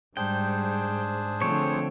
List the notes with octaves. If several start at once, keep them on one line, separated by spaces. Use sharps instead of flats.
G#2 G3 D4 G#4 C5 G5
D3 F3 A3 C4 C#5